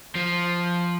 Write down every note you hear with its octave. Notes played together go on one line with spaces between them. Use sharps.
F3